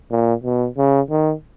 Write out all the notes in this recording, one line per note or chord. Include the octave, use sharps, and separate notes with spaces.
A#2
B2
C#3
D#3